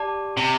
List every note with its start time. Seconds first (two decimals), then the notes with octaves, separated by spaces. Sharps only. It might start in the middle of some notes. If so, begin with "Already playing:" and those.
Already playing: G4 D5 A5
0.37 C3